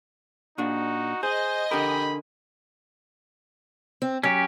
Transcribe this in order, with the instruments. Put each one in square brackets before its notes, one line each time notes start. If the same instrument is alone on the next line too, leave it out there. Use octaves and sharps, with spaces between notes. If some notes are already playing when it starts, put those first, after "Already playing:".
[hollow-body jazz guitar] A#2 D4 [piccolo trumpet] D#4 [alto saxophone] F#4
[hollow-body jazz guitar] G#4 [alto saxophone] C5 [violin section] D#5 G#5
[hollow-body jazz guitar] D3 A#4 [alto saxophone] G4 [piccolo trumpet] B5
[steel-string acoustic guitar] C4
[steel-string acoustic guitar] F#3 [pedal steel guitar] C#4 G4